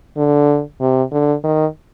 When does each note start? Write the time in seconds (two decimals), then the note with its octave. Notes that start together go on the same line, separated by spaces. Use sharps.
0.17 D3
0.81 C3
1.12 D3
1.44 D#3